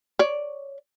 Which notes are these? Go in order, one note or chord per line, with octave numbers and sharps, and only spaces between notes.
C#5 D5